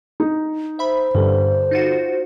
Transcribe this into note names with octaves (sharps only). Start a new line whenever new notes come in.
D#4
C5 E5 B5
G2 D3 G3
D#4 F4 F#4